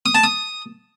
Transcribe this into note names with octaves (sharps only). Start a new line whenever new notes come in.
D#6
A5
D#6